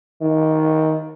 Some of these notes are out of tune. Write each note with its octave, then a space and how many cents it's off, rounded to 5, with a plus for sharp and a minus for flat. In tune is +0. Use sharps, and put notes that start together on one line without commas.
D#3 +15